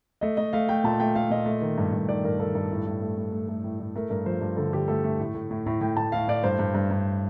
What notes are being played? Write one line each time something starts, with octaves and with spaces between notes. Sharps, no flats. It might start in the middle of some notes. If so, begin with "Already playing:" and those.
A3 D#5
A3 D#5
A3 F5
A3 G5
A#2 A5
A3 G5
A3 F5
A#2 D#5
A3
D#3
G2
G2
D#3 D5
G2 A#4
D#3 A4
G2 A4
A2
A2
A3
A3
A3
A3
A2
A2
A3 A#4
G2 A#4
F3 C5
G2
D3 A4
D3 G4
A3 A4
A3
A2
A2
A2
A2
A2 G5
A2 A5
A2 F5
A2 D5
G2 C5
G2
G2
G2